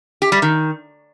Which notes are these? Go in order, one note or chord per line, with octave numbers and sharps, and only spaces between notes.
G4
G3
D#3